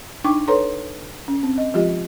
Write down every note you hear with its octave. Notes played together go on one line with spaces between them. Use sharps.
D4 D#4 G5 C#6 D6
A4 B4 C#5 A#5 C6
C#4
C4
D#5
F3 G#3 F4 G4 D#5